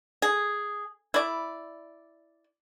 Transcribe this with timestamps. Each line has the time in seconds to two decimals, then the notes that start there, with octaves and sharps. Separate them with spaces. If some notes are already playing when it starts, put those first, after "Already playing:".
0.22 G#4
1.14 E4 D5